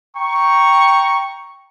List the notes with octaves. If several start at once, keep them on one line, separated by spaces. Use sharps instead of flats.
G5 A#5 C#6